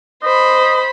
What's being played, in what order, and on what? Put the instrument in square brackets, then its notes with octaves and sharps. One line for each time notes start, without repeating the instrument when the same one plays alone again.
[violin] C5 B5 [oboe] D#5